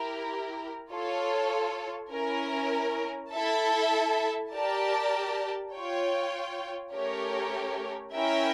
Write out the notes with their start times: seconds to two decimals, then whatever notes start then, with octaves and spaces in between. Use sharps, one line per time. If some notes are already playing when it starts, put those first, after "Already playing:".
Already playing: E4 G4 A#4
0.92 F4 A4 C#5
2.12 C#4 E4 A#4
3.32 E4 A4 E5 A5
4.53 G4 A#4 D5 A5
5.73 F4 C#5 G5
6.94 A3 C#4 G4 A#4 C#5
8.14 C#4 E4 A#4 E5 G5